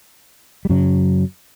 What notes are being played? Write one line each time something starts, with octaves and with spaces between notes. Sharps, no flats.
G3
F#2 C#3 F#3